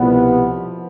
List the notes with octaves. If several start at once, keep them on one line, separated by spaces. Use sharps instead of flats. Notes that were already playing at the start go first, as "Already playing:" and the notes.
Already playing: C2 B2 F3 G3 B3